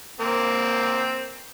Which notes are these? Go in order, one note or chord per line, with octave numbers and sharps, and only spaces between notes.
A#3 C4